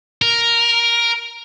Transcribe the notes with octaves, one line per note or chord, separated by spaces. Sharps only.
A#4